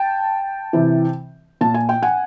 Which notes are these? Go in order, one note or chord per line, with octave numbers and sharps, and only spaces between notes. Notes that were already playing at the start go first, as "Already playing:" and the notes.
Already playing: G5 A5
C3 E3
A#2 A5
G#5
G5
F#5 G#5